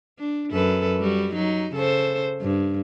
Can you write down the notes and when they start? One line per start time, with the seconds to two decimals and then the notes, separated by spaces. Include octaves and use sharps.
0.18 D4
0.52 F#2 A4 B4
1.00 G3 F#4
1.32 F#3 D#4
1.73 C#3 A4 C5
2.41 G2